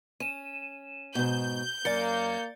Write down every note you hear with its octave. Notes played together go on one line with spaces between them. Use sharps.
C#4 D#7 E7
G#2 B2 G6
F#2 A#3 D5 A6 C#7